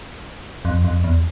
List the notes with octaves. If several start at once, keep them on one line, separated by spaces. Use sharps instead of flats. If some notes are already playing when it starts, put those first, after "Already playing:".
F2
F2
E2